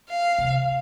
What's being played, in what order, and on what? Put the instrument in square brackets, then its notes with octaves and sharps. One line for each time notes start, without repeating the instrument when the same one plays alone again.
[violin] F5
[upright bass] C3